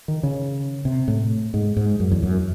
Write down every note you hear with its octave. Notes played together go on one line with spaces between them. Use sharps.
D#3
C#3
C3
A2
G#2
G#2
F#2
E2
F#2